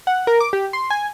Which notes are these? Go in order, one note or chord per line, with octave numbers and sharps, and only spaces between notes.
F#5
A#4
D6
G4
C6
G#5